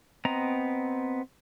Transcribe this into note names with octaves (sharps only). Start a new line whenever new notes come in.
B3 C4 D#5 A#5